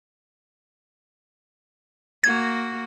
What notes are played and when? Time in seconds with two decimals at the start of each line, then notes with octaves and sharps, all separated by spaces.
2.24 A#3 F#4 G#6